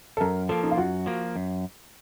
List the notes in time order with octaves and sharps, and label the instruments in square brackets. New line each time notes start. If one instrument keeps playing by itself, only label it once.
[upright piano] A4
[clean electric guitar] F#2 [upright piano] A#4
[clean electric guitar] F3 A#3 [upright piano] A4
[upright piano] D#4
F4
[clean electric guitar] F#2 [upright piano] F#4
[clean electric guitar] F3 A#3
F#2